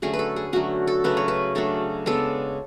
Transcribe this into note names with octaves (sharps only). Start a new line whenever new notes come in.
D3 F#3 A3 C#4 G#4
B4
A4
G#4
D3 F#3 A3 C#4 F#4
A4
C#3 F#3 A3 D4 B4
C#5
B4
C#3 F#3 A3 D4 A4
C#3 G#3 B3 D4 A4